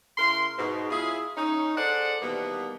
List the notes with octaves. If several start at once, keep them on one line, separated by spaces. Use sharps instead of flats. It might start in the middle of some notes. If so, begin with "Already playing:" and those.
C#3 E4 A#4 C6
G#2 B2
E4 F4 G#4
C#4 D#4
G#4 A4 C5 D5 F#5
B2 D#3 E3 G3 A#3 B3